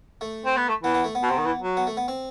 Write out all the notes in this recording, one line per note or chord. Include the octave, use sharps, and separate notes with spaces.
A3
C4
B3
A3
E3 B3
B3
A3
B3
B2
C3
D#3
E3
F#3
B3
A3
B3
C4